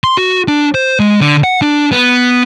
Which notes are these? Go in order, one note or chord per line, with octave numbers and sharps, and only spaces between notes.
C6
F#4
D4
C5
G#3
D3
F#5
D4
B3